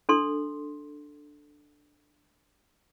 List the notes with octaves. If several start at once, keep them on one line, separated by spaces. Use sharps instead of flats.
D4 A4 C6